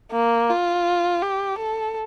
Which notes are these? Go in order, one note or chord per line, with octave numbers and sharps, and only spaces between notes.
A#3
F4
G4
A4